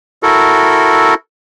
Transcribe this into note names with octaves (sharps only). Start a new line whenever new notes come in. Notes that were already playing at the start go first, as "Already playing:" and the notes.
E4 F#4 A4 A#4